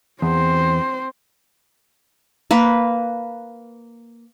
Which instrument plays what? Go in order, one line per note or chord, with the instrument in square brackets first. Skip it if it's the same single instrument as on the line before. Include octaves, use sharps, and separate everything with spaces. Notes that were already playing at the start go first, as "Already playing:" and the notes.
[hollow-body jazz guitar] E2 [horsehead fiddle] C4 C5
[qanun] A#3 B4